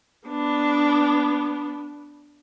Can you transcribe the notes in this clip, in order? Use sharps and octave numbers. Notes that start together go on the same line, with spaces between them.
B3 D4